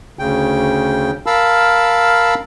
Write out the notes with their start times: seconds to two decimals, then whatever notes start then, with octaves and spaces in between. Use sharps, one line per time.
0.19 D2 C#3 G5
1.26 A#4 F5 A5 B5 E6